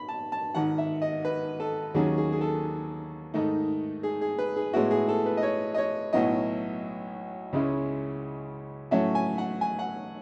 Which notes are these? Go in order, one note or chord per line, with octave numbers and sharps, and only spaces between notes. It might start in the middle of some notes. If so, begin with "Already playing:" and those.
Already playing: B5
A5
A5
G#1 G#2 D#3 F#5
E5
D#5
B4
A4
D#2 D#3 F#3 C#4 G#4
G#4
G#4
A4
G#2 D#3 A3 D#4
G#4
G#4
B4
G#4
A2 G#3 B3 E4 F#4
G#4
A4
B4
D#5
C#5
D#5
C#5
B1 A2 F#3 B3 E4 D#5
C#2 C#3 G#3 C#4 E4
A2 F#3 A3 C#4 E5
G#5
F#5
G#5
F#5